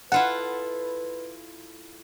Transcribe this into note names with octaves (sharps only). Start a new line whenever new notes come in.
E4 F4 A4 B4 F#5